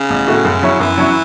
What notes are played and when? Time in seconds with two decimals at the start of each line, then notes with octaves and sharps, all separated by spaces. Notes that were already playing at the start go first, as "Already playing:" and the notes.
Already playing: C#3
0.10 A1
0.27 A2 A3 F#4
0.45 F#2
0.62 F#3 C#4 E4
0.80 F#2 E3
0.97 F#3 C#4 E4